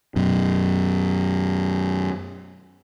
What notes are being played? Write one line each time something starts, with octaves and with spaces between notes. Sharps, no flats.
F#2 B2